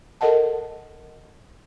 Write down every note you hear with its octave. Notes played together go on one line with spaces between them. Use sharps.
A4 A#4 D#5 F#5 A5